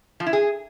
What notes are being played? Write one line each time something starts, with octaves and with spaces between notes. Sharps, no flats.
F3
E4
G#4